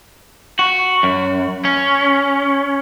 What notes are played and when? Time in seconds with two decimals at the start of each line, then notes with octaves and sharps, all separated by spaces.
0.59 F#4
1.03 F#2
1.65 C#4